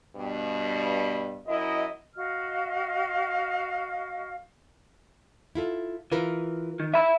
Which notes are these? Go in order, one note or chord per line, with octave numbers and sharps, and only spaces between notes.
G2 B2
F#2 E4 D#5
F#4 D#5 F5 F6
E4 F4 A4
E3 F4 A#4 B4
D#3
E5 B5